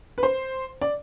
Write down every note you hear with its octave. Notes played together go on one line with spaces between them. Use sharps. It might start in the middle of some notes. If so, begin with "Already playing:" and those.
B4
C5
D5